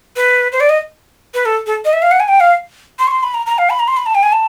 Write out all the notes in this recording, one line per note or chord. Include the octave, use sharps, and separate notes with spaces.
B4
C5
D5
D#5
B4
A4
A4
D#5
E5
F5
F#5
G#5
G5
F5
C6
C#6
C6
B5
A#5
A#5
F5
B5
A#5
C6
B5
A5
G5
G#5
A5